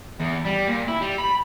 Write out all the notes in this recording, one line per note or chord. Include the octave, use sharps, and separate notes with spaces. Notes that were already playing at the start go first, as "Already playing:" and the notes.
E2
G3
A#2
E4
G3
B5